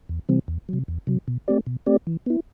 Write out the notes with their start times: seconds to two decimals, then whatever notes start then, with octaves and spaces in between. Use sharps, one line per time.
0.09 E2
0.29 C3 E3 G3 C4
0.48 E2
0.69 C3 F#3
0.88 E2
1.07 C3 F#3
1.28 B2
1.48 A3 C4 G4 D5
1.67 B2
1.86 A3 C4 G4 D5
2.07 E3
2.26 B3 E4